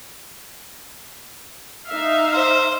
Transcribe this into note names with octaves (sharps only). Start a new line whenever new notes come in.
D#4 E5 F5
C5